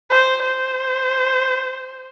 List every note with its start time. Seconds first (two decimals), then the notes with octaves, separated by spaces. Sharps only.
0.11 C5
0.42 C5